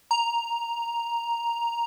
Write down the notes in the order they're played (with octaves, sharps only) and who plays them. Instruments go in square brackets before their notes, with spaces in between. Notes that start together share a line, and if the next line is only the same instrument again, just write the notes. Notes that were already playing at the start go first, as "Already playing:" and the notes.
[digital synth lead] A#5